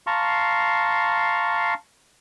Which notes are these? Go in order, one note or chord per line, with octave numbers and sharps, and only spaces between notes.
F5 A5 A#5 C6 C#6